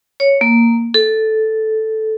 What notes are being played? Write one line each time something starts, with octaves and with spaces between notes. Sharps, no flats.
C#5
A#3
A4